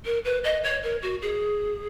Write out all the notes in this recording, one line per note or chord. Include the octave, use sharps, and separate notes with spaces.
A#4
B4
D#5
C#5
A#4
F#4
G#4